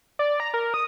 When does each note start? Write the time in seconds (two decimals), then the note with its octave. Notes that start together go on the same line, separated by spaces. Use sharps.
0.19 D5
0.40 A#5
0.54 A#4
0.74 D#6